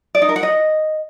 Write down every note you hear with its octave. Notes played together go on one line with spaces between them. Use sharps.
D5
D#4
A#4
F#5
D#5